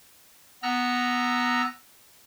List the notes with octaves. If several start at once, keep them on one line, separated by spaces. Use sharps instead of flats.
B3 A#5 E6 F#6 A#6